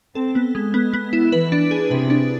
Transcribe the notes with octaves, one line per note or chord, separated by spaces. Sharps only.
C4 A4
B3
G#3
B3
B3
E4
E3 B4
D4
G#4
C3 B4
D4